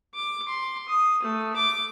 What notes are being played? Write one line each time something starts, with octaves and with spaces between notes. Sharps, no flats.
D6
C6
D#6
A3
D6